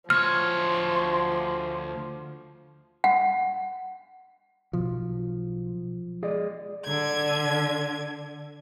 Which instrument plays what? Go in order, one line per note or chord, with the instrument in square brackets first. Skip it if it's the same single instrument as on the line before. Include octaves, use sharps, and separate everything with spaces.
[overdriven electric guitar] D2 C#5 [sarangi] F3 [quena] C6 [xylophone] F6
[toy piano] F#5
[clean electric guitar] B1 [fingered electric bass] F3
[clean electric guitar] G#4 D5 D#5
[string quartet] D3 G#6